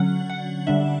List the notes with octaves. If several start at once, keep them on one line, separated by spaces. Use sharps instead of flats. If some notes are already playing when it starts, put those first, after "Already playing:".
Already playing: D3 F#3 C#4 F#5
F#5
D3 G3 D4 E5